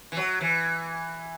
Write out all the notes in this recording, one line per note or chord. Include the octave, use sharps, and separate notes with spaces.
E3
F#3
E3